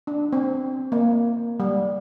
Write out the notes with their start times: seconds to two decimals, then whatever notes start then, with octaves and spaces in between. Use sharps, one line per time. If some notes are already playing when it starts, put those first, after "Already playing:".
0.07 D4
0.33 C4
0.92 A#3
1.60 G3